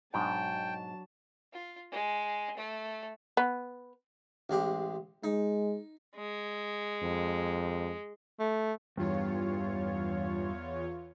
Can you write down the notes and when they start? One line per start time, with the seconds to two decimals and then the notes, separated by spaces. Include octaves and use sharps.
0.14 G#2 B2 F#3 G#3 D4 G5 A5
1.53 F4
1.92 G#3
2.57 A3
3.37 B3
4.50 A1 G#3 G4
5.24 G#3 D#4
6.16 G#3
7.03 F2
8.40 A3
8.98 E2 G2 F4 C#5